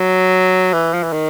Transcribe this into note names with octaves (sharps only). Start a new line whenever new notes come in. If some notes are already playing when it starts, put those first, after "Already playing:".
Already playing: F#3
E3
F3
E3
D#3